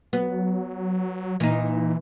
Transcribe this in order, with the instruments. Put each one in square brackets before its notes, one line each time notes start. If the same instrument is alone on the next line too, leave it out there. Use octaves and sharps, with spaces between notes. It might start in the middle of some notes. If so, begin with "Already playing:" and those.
[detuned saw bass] F#3 [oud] B3
[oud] A#2 D#4 [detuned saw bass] E3